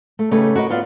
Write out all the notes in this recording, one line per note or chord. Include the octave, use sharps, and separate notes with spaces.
A3
C#3 A3 D#4 G4 B4 C#5
F#4 A#4 B4 D#5
B3 F4 D5 F5 F#5